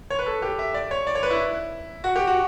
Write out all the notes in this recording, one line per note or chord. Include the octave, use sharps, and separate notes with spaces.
C#5
B4
A4
G4
E5
D5
C#5
D5
C#5
B4
E4
F#4
G4
F#4